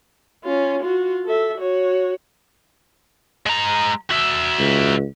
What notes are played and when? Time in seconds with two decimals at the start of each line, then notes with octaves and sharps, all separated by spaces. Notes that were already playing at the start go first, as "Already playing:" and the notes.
0.45 C#4 F4
0.82 F4 F#4
1.26 A4 E5
1.58 F#4 C#5
3.46 G#3 A#5
4.10 F#4 E5
4.59 C#2